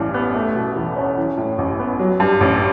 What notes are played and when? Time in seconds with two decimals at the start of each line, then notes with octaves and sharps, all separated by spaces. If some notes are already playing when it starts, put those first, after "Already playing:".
Already playing: A1 G2 E3
0.14 B3
0.35 A3
0.55 B2
0.76 E2
0.96 C#4
1.17 E3
1.38 A2
1.58 A1
1.79 B3
1.99 F#3
2.20 G2
2.41 A1